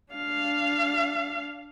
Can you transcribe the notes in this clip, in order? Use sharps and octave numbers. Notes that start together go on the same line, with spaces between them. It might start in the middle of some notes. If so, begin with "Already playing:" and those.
D4 F5